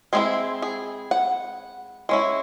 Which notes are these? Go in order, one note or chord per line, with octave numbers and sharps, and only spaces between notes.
G#3 C4 E4 G#4
G#4
F#5
G#3 C#4 E4